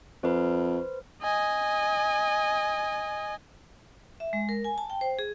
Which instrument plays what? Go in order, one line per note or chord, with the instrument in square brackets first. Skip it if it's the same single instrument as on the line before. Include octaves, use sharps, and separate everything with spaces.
[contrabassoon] F2 [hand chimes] B4 C5
[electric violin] D#5 G#5
[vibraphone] E5
G#3
A#4
G#5
A5
G5
C5
G#4